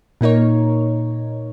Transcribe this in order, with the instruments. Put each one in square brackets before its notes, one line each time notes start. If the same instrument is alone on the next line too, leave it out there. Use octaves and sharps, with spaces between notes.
[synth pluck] A#2 A#3 D#4 A#4 C#5